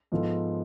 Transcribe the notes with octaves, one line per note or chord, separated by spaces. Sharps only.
G#2 F3 B3 F4 A4